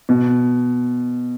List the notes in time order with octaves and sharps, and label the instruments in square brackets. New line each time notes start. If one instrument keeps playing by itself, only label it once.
[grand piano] B2